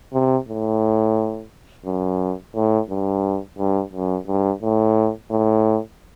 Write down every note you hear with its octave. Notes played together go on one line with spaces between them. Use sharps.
C3
A2
F#2
A2
G2
G2
F#2
G2
A2
A2